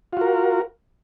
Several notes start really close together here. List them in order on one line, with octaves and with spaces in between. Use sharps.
F4 F#4 A#4